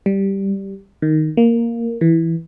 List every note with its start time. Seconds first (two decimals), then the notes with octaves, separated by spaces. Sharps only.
0.06 G3
1.02 D#3
1.37 A#3
2.01 E3